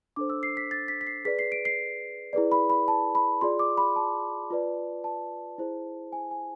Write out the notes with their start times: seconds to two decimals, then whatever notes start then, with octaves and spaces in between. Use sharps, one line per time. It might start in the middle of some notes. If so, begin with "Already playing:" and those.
0.16 D4 A4 C5 D6
0.30 E6
0.43 C7
0.57 B6
0.71 A6
0.88 B6
1.01 B6
1.07 C7
1.25 G#4 B4 D5 B6
1.39 C7
1.52 D7
1.65 C7
2.33 E4 G#4 B4 D5
2.52 B5
2.70 B5
2.88 A5
3.15 B5
3.41 F4 G#4 D5 C6
3.59 D6
3.77 B5
3.96 A5
4.51 F4 B4 D5
5.04 A5
5.58 E4 G#4 C5
6.12 G#5
6.31 G#5